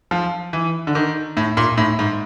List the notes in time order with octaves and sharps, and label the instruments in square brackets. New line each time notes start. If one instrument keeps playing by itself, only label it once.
[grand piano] F3
E3
D3
D#3
A2
A#2
A2
G#2